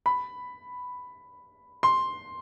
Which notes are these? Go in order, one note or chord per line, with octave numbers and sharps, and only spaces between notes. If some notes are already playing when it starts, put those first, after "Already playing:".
B5
C6